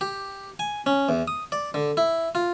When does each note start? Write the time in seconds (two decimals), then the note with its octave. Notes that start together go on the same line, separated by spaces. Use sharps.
0.01 G4
0.59 G#5
0.86 C#4
1.09 E2
1.28 D#6
1.52 D5
1.74 D3
1.97 E4
2.35 F4